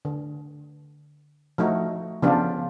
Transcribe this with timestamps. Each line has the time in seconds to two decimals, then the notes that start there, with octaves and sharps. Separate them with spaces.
0.05 D3
1.58 F3 A3 D#4 F#4
2.22 C#3 F3 B3 D4 F4 G4